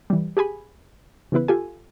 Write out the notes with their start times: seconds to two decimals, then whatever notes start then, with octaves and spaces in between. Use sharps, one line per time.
0.10 E3 G3
0.37 G4 G#4 G#5 B5
1.32 C#3 E3 B3 E4 B4
1.48 F4 G4 A4 G#5